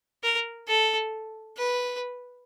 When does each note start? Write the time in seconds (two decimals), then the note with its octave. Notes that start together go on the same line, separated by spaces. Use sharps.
0.23 A#4
0.68 A4
1.58 B4